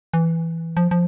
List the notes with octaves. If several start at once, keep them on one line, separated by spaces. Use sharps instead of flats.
E3
F3
F3